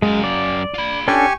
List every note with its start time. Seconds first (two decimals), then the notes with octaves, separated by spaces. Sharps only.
0.02 F#2 G#3 F5
0.24 D5
0.74 F4 B5
1.08 C#4 D4 G4 A4 G#5 C#6